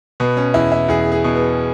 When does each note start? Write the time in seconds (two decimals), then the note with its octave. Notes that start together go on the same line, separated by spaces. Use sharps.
0.20 B2 B3
0.37 C#4
0.54 E2 E4
0.72 E4
0.88 E2 G#4
1.12 G#4
1.24 B2
1.36 B3